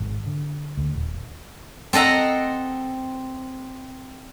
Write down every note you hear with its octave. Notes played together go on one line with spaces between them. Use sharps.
G#1
D3
D2
D#1
C4 A4 D#5 F#5 A#5